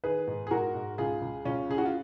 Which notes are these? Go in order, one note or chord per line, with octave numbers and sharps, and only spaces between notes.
D#3 G#4 B4
G#2
G#4
G#2 F#4 A#4
G#2
C#2 F4 G#4
C#2
C#2 C#4 F4
C#3 G#4
F#4
F4